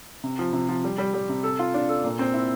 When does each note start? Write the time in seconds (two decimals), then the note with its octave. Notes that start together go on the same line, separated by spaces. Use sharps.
0.24 C3
0.39 F3
0.53 C3
0.69 F3
0.84 G3
0.98 G3
1.14 G3
1.29 C3
1.43 A4
1.59 F4
1.74 D4
1.89 A4
2.04 A#2
2.19 C4
2.34 E4